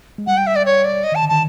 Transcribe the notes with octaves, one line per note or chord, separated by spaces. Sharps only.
G#3
G3 F#5
G5
E5
D5
C#5
D5
D#5
D#3
A5
D3
D#3 A5